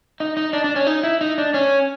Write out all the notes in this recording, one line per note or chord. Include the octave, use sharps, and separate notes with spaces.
D#4
D#4
D4
D4
C#4
D#4
E4
D#4
D4
C#4